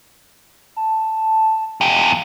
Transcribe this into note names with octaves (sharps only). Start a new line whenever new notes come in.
A5
E2 G4